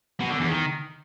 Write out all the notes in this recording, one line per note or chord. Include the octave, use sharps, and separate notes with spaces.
B2
D3
E2
D#3